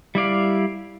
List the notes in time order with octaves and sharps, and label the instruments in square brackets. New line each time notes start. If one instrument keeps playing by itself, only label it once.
[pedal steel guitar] G3 E4 D5 F5